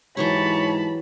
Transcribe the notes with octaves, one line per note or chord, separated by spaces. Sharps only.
G#2 E3 F#3 G4 C#5 A5 B5